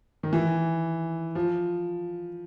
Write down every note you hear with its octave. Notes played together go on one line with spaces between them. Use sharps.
D#3
E3
F3